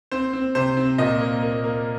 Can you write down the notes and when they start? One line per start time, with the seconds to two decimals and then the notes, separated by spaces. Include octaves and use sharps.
0.11 C4 C5
0.33 C4
0.55 C3 C5
0.77 C4
0.98 A#2 D#5
1.21 A#3
1.43 A#3
1.64 A#3